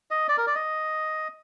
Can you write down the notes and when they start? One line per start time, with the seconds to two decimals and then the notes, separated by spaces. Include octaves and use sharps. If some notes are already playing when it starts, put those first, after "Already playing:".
0.11 D#5
0.28 D5
0.38 A#4
0.47 D5
0.55 D#5